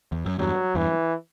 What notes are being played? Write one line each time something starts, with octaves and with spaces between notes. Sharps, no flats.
E2
F#2
E2 G2 F#3
E2 G2 E3